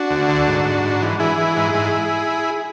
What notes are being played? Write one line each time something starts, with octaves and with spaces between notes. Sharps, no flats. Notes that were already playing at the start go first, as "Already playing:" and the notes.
Already playing: D4 F#4
D2
D3
G#2
G#2
G#2
E3
E3 E4 G#4
E3
G#2
G#2